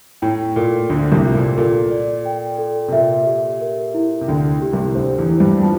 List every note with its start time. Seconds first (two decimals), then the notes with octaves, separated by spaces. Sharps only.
0.22 A2 G5
0.56 A#2 A4
0.90 D2 D3 C5
1.12 C2 C3
1.24 F4
1.35 A#2
1.58 A#2 A4
1.91 D5
2.25 G5
2.58 A4
2.88 C3
2.92 A#2 E5
3.26 G4
3.61 A#4
3.94 E4
4.21 C3
4.28 D2 D3 G5
4.62 G4
4.72 C2 C3
4.95 D2 D3 C5
5.18 E2 E3
5.29 E4
5.40 G2 G3
5.58 G3
5.63 F3 A5